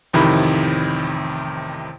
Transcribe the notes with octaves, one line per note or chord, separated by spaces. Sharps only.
A1 F2 C3 D#3 E4 B5